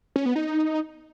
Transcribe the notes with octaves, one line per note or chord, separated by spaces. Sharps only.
C#4
B3
D#4